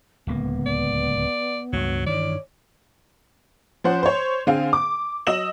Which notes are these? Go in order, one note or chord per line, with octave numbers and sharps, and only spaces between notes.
D1 C#2 A#3 B3
D5
C#2 G2 F#3
G2 D#3 E3 C#5 D5
F3 C#4 C5 F#5
C5 C#5
D3 C4 G#4 F5
D6
F#3 D#5 E6 E7 F#7